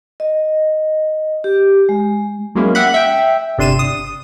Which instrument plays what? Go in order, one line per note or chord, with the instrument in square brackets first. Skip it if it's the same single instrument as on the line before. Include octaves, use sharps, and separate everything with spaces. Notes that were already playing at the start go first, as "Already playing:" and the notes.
[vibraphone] D#5
G4
G#3
[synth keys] F#3 G#3 A#3 C#4 E4
F#4 G4 E5 F#5 B5
E5 G5
G1 C3 D4 C6 D#7 E7
D#6